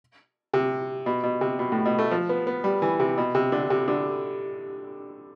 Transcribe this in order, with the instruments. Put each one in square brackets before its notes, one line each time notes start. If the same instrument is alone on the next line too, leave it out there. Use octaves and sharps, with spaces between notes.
[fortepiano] C3
B2
B2
C3
B2
A2
B2
A3
F3
B3
B3
G3
E3
C3
B2
C3
D3
C3
D3